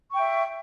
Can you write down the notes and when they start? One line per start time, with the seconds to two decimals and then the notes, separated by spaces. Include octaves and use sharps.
0.10 C#6
0.15 G5
0.20 E5